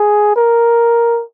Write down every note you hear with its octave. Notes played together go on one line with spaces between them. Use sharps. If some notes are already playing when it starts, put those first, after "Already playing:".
Already playing: G#4
A#4